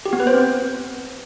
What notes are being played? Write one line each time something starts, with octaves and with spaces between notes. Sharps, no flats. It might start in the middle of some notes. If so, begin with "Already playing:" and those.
G4
B3
B4
C5
C4